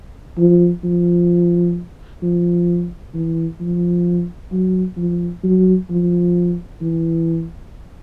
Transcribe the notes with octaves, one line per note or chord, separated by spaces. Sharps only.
F3
F3
F3
E3
F3
F#3
F3
F#3
F3
E3